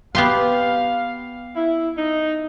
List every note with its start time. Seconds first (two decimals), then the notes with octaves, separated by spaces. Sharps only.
0.15 B3 G4 F5 C6
1.55 E4
1.97 D#4